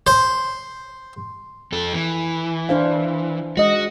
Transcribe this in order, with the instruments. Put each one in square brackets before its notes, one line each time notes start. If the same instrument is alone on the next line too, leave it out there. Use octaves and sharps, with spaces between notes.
[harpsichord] C5
[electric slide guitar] F2 A4
E3
[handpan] D4 C5 F5
[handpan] G#3 D#5 [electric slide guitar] F#4